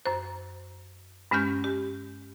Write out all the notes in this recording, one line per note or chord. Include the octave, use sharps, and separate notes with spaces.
F#2 C5
G2 G#3 C#4 F6 G6
G4